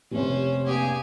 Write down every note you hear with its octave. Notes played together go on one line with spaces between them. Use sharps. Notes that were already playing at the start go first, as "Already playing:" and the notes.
F1 C3 C#4 C5
G2 A#3 G4 G#4 G#5